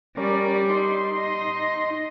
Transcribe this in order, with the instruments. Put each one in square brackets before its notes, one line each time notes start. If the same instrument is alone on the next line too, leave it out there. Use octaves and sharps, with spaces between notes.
[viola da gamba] G3 [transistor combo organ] C#4 A#4 D5
[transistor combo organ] D#4 C6
[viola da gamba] D#5